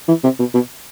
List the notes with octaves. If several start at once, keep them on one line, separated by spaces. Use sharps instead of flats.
E3
C3
B2
B2